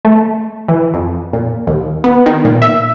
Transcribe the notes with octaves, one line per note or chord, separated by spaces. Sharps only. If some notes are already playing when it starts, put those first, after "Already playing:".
A3
E3
F2
A#2
D#2
B3
D#3
A#2
E5